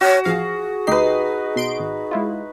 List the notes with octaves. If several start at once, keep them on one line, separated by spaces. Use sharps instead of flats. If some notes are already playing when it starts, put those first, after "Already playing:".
F#4 C#5
A1 F3 G#4 F5
D2 D#4 G4 B4 C7
B2 C6 D7
G#1
G#3 E4 F4